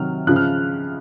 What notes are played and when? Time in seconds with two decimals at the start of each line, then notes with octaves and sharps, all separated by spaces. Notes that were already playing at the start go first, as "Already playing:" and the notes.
Already playing: C3 D#3 F#3 F6
0.27 C#3 F3 F#6
0.36 F6